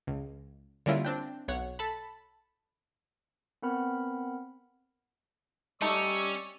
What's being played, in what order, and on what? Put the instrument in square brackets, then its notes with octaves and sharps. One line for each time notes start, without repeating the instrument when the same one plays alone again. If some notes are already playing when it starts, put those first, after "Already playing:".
[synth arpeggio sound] C#2
D3 G3 A#3 C#4 E4 F4
C4 D4 G5
B1 C#5 F#5
A4 A5 B5
[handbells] B3 C4 A#4 F#5 B5 F6
[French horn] G3 [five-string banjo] A3 D#4 A4 [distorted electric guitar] C#4 [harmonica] D5 C#6 E6